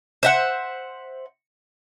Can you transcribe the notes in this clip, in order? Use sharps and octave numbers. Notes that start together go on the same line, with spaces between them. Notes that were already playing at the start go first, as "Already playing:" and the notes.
C5 E5 F#5